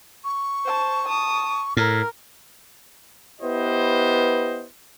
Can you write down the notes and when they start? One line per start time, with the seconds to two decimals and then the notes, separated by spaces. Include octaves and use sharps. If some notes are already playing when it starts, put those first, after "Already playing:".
0.24 C#6
0.65 C5 A5
1.07 A5 D#6
1.77 A2 A#4 F6
3.41 B3 E4 G4 B4 C5 D#5